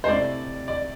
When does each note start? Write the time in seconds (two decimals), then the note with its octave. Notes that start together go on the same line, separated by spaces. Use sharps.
0.04 C5
0.08 C3 A3 E4 D5
0.68 D5